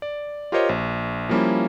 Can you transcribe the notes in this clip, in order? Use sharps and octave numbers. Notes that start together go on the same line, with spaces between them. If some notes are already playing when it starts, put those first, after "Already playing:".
D5
F4 G4 A#4 C5 C#5 D#5
A#1
F3 G3 A#3 C#4 E4